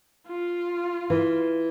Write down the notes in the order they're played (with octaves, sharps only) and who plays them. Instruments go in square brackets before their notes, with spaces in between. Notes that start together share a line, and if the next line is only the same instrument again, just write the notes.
[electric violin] F4
[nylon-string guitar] E3